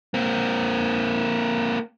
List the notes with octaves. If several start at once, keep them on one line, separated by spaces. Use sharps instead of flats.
A#3 C4